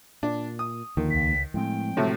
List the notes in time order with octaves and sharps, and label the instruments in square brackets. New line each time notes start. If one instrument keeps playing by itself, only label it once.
[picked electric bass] A#2 [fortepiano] D4
[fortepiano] D#6
[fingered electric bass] D#2 [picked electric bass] D3 F3 [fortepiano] D#3
[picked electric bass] D#1 C#2 [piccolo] B6
[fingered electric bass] A2 [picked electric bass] F3 G#3 C4 [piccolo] G5
[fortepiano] A2 C3 F#3